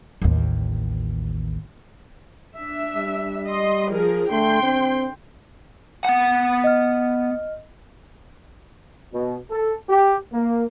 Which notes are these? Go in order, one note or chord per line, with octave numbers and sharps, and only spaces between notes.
A1 D#2
D4 E5
G3
D#5 C6
F3 G#4 A#4
D3 A3 G5 C6
C4
B3 F#5
D#5 F6
B2
A4
G4
A#3